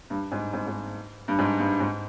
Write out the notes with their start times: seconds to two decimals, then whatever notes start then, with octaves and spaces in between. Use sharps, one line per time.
0.10 G2
0.32 G#2
0.53 G#2
0.67 G#2
1.28 G2
1.39 G#2
1.59 G2
1.80 G#2